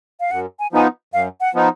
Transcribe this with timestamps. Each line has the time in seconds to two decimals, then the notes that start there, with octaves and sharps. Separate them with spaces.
0.20 F5
0.31 F#2 F#5
0.59 G#5
0.73 F3 B3 D#4 G#5
1.13 F#2 F5
1.41 F#5
1.54 F3 B3 D#4